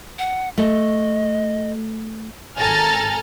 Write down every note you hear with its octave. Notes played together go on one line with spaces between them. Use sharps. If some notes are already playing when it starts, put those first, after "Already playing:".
F#5
A3 D#5
G#1 A4 G#5 A#5 F6 A6